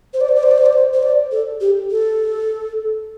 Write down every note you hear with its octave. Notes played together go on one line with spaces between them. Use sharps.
C5
D5
C5
D5
C5
D5
C5
D5
C5
C5
D5
A4
G4
A4